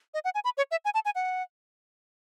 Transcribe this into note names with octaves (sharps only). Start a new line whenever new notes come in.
D#5
F#5
G#5
B5
C#5
E5
G#5
A5
G#5
F#5